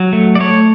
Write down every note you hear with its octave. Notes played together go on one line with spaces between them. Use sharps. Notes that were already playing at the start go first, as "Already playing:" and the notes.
Already playing: F#3
A3
D5
A3 C#5